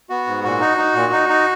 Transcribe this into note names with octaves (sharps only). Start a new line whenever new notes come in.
B3 F#4
G#2
A#2 F#4
D#4
D#4
A#2
D#4
D#4